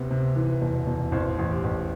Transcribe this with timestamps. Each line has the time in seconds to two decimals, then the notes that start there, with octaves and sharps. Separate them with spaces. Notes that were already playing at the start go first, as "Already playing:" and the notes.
Already playing: D2 C3 B3
0.11 C3
0.36 E3
0.61 E1
0.87 E1
1.12 A1 C4
1.38 A1
1.51 G4
1.63 A1